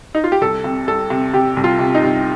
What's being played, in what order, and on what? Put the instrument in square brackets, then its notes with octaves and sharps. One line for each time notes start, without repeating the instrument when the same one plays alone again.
[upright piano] D#4
F4
G4
C2 A4
C3
C2 A4
C3
C3 G4
C2
F4
C3
D#4
C2